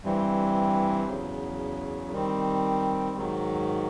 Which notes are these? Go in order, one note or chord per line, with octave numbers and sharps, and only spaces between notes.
G2 E3 G3 C4
E2 C#3 F#3
D#3 G3 C4
G#2 D#3 F#3